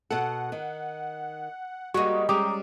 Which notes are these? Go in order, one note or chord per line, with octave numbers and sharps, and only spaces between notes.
B2 A4 F#5
D#3
G3 G#3 A#3 B3 D#4 F#4 C#6
G3 G#3 C#4 G4 A#5 D6 D#6